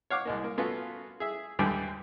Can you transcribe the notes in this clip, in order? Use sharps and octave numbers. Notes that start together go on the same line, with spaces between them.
C#5 F5 F#5 D6
C2 G#3 A#3
A#3
A3 B3 C#4 F4 F#4
G#4 E5
D#2 G#2 D3 E3 G3 G5